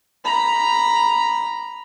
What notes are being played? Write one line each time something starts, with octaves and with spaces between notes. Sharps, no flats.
A#5 B5